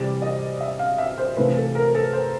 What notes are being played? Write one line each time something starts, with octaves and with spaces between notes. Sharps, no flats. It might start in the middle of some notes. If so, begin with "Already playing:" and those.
Already playing: C3 E3 G3 D5
D#5
E5
F5
E5
C5
C3 E3 A3 B4
A4
A#4
A4
C5